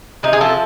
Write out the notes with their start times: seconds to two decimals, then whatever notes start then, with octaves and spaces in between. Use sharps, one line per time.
0.23 C3 D#4
0.33 G#4
0.41 F3 A4